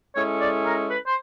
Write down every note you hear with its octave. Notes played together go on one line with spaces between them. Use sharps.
G#3 C#4 E4 A4 C#5
D5
A#4
B4
C5